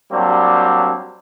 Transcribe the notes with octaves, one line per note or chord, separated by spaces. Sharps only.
F#3 G3 A#3 C4 D4